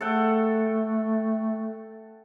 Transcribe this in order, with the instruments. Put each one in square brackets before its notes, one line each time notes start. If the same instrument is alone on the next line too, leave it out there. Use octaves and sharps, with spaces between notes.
[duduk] A3 [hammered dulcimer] A4 F#5 G5